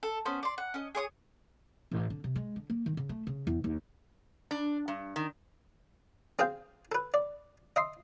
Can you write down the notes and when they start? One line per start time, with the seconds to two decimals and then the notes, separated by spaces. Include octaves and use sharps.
0.03 A4
0.25 B3 C#4 C5
0.43 D5 C6
0.58 F#5
0.74 C#4 D#5
0.95 G#4 C#5 C#6 D#6
1.91 A1
2.10 D3
2.24 C3
2.36 G#3
2.56 D3
2.70 A#3
2.86 D#3
2.97 C#3
3.09 A3
3.27 C#3
3.47 E2
3.64 D#2
4.51 D4
4.88 G2
5.16 D#3
6.39 C4 G#4 C5 F5 G5
6.92 A4 B4
7.14 D5
7.76 D#5 E5 C6